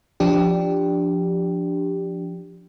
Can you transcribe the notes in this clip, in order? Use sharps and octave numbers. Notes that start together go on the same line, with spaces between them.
F3 D4 G4